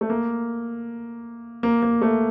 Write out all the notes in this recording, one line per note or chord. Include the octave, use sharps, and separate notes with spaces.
A3
A#3
A#3
A#3
A3